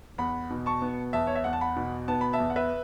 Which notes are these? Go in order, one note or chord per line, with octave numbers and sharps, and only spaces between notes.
E2 F#5 B5
B2
A5 C#6
B3
E2 E5 A5
C#5
E5
E2 F#5
A5
F#5 B5
B2
B3 A5
B5
E5 A5
E2
F#5
B4 E5